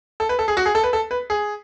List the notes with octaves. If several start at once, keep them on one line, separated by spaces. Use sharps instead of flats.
A4
B4
A4
G#4
F#4
G#4
A4
B4
A4
B4
G#4